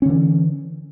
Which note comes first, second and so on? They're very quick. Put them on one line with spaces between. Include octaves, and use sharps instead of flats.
C#4 D3 E3